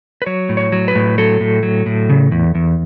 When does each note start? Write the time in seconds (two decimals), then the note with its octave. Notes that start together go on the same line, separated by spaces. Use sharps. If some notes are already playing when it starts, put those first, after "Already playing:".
0.22 B4
0.26 F#3 C#5
0.49 A2
0.57 C#5
0.72 F#3
0.88 B4
0.95 A2
1.18 F#3 A4
1.41 A2
1.63 F#3
1.86 A2
2.09 C#3
2.31 E2
2.55 E2